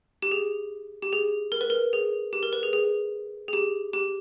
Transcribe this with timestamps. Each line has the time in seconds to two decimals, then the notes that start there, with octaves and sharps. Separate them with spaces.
0.22 G4
0.32 G#4
1.02 G4
1.13 G#4
1.52 A#4
1.61 B4
1.70 A#4
1.93 G#4
2.33 G4
2.43 A#4
2.53 B4
2.63 G#4
2.73 G#4
3.48 G#4
3.53 G4
3.93 G4